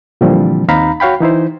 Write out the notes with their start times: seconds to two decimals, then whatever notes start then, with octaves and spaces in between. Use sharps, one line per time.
0.21 A#2 D3 E3 F3 G3 C4
0.68 D#2 C4 D#4 F5 A#5 B5
1.00 F#4 C#5 F5 G5 B5
1.20 E3 D#4 E4 C5